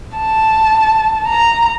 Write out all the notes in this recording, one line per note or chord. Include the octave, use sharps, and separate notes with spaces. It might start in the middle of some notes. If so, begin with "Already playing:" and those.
A5
A#5